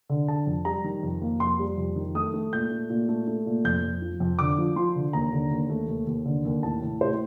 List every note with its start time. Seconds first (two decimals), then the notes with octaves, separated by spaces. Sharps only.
0.09 D3
0.28 D3 A5
0.47 F2
0.65 G3 A#5
0.84 D#3
1.03 F2
1.22 A#3
1.40 F2 C6
1.59 G3
1.78 F2
1.96 D#3
2.15 A3 D#6
2.34 A3
2.53 A#2 G6
2.71 A3
2.90 A#2
3.09 A3
3.27 A3
3.46 A#2
3.65 F2 G6
3.83 F2
4.02 F3
4.20 F2
4.39 D3 D6
4.58 F3
4.76 F3 C6
4.95 D3
5.13 D#2 A#5
5.33 D3
5.51 D#2
5.70 A3
5.89 D#2
6.07 D#2
6.25 D3
6.45 D#2
6.63 A2 A5
6.82 A2
7.01 A2 C5